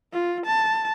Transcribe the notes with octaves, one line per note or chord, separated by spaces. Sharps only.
F4
A5